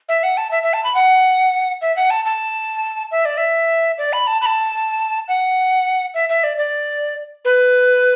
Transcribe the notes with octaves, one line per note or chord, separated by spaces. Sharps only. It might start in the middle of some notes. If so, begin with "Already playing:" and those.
E5
F#5
A5
E5
E5
A5
B5
F#5
E5
F#5
A5
A5
E5
D5
E5
D5
B5
A5
B5
A5
F#5
E5
E5
D5
D5
B4